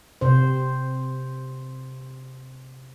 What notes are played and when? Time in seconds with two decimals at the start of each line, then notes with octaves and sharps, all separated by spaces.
0.21 C3 C5